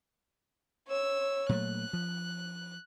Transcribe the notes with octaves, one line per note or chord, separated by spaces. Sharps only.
C#5 E6
A#2 F#3 A3 F#6
F3